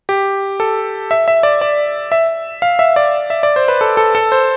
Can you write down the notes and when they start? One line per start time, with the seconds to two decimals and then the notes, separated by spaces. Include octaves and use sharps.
0.09 G4
0.60 A4
1.11 E5
1.28 E5
1.43 D5
1.61 D5
2.12 E5
2.62 F5
2.79 E5
2.96 D5
3.30 E5
3.43 D5
3.56 C5
3.68 B4
3.81 A4
3.97 A4
4.15 A4
4.32 C5